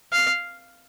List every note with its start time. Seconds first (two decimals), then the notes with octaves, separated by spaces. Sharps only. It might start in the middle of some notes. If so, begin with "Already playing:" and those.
0.12 F5